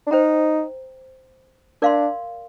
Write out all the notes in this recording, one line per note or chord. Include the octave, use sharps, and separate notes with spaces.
D4
D#4 C5 G5 A#5
D4 A#4 D5 F5 C6